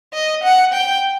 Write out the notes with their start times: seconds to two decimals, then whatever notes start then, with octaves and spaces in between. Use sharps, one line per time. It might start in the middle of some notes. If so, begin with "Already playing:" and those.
0.14 D#5
0.43 F#5
0.73 G5